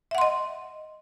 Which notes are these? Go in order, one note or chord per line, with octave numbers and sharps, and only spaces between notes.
D#5 E5 F#5 C6